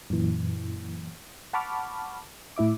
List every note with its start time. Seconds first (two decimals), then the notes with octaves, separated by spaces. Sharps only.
0.10 F#2 A#2 E3
1.53 F#5 A5 B5 C#6 D6 F6
2.56 A2 E4 E5 D6